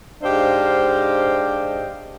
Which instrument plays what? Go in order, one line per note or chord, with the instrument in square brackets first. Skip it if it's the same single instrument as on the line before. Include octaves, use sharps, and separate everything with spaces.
[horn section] G#2 D4 G4 C5 D#5 F5